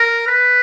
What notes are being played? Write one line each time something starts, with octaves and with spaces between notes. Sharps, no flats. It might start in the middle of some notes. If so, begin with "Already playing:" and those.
Already playing: A#4
B4